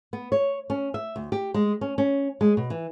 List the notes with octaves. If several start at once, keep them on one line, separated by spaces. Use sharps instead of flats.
B3
C#5
C#4
E5
D2
G4
G#3
C#4
C#4
G#3
B2
E3